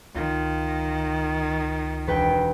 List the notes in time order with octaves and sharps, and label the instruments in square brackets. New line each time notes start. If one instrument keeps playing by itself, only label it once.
[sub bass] C#2 [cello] D#3 [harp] F4
[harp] E1 B4 G5